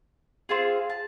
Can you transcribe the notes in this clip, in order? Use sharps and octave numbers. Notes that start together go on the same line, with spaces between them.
C4 F4 G#4
A5